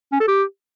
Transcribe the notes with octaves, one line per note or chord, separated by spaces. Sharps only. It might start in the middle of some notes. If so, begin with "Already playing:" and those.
C#4
A4
G4